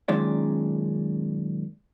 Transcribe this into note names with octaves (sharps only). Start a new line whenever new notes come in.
F#2 A#2 D#3 G#3 C#4 D4